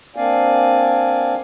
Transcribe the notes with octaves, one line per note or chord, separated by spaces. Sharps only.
A#3 C4 D4 D5 F5 G#5